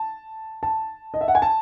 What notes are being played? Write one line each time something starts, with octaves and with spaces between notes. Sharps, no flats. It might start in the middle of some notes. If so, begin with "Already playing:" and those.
Already playing: A5
A5
D#5
E5
F#5
G#5
A5